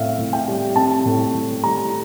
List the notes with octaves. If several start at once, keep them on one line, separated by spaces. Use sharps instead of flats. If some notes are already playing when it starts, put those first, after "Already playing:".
Already playing: A2 C4 E5 F5
A2
G5
G3
C4 A5
A2
A2
G3 A#5